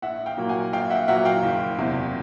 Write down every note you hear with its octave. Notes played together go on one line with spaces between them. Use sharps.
A#1 E5 F#5
F5 G5
A#2 F#3 A#3
F#5 G#5
A#1 F5 G5
E5 F#5
A#2 F#3 A#3 E5 F#5
F5 G5
F#1
E2 C3